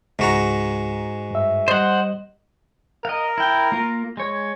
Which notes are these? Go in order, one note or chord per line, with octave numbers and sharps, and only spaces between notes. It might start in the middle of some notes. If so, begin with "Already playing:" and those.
C#2 G#2 F#4 A#5
G2 E5
G3 C5 D#5 F#5
A#4 D#5 F5
E4 G5
A#3 F4
G#3 C#5